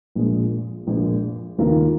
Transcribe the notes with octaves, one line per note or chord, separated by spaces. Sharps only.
A#1 A#2 G#3
A#1 A#2 G#3
D#2 D#3 A#3 F4 A#4